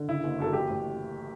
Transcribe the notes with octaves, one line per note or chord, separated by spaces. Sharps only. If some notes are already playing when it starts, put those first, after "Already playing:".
Already playing: D3
C#3 E4
F#1
F#2 A4
A1 G4
A2